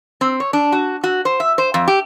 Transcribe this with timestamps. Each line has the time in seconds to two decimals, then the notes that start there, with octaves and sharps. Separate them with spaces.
0.21 C4
0.40 C#5
0.53 D4
0.72 F#4
1.04 F#4
1.25 C5
1.40 E5
1.58 C5
1.74 F2
1.88 G4